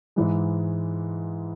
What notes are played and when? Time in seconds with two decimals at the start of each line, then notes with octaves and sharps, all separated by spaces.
0.16 G#2 E3 G#3